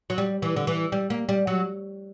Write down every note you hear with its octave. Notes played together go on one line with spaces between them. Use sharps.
F#3
G3
E3
D3
E3
G3
A#3
G3
F#3